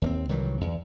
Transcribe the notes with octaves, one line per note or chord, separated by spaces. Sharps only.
D#2 A3 C4
C2 D#3 E3 F#3
E2